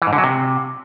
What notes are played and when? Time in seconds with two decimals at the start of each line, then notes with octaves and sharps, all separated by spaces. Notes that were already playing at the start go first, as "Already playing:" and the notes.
0.02 E3
0.07 G#2
0.13 D3
0.18 F#3
0.24 C3